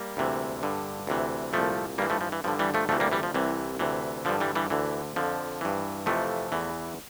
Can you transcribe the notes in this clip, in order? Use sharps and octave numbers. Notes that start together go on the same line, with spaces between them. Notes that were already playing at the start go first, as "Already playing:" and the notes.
Already playing: G3 A#3
D2 C3 E3
G2 D3
D2 C3 E3
C2 A#2 F3 A3
G2 E3 G3 A#3
F3 A3
F3
E3
G2 D3 F3
E3 G3
F3 A3
D2 C3 E3 F3 A3
G3 A#3
E3 G3
F3
C2 C3 E3
D2 C3 E3
G2 D3 F3
E3 G3
E3 G3
D2 D3 E3
F2 D3 F3
G2 E3
F2 C3 E3 F3 A3
E2 E3